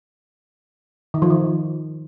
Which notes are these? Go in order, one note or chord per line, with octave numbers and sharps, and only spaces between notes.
D#3
F3
D#3